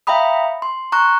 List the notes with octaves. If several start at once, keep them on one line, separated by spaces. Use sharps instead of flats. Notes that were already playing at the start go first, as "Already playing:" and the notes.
E5 F5 G5 A#5 B5 D#6
C6
A#5 C#6 F#6